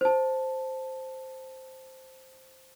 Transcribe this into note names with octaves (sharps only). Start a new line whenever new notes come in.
C5 A5